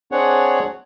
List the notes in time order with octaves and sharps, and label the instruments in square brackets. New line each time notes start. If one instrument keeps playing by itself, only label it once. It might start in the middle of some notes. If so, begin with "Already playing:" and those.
[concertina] C4 D4 G#4 C#5 F#5